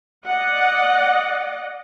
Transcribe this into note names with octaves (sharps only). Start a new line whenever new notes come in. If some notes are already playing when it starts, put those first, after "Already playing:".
D5 D#5 F#5